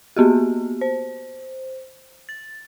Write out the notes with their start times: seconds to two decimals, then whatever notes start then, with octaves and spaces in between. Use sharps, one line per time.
0.16 A#3 B3 F#4 G4
0.81 C5
2.29 A6